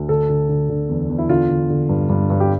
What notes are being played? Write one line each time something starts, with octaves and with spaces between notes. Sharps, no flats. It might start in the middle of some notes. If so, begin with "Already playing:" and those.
Already playing: D2
D3 A4
D3
D3
D3
E2
E2
E4
D3 F4
D3
D3
G2
G2
G2
G4